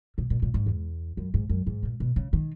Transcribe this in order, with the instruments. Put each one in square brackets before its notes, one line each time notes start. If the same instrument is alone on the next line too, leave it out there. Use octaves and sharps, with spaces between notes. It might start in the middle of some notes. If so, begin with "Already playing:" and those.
[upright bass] B2
A#2
A#2
G#2
E2
F#2
G#2
F#2
G#2
A#2
B2
C#3
D#3